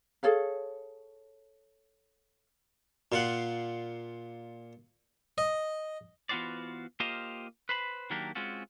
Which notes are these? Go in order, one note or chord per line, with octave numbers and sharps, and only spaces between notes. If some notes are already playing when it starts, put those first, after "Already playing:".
G#4 A4 C#5 F5
A#2 F4 F#5
D#5
E3 B3 F4 F#4 C5 D5
A#3 F4 G4 C5 D#5 F5
B4 C5 B5
D#3 F#3 A#3 D4 G4 A#4
G#3 C4 C#4 F4 F#4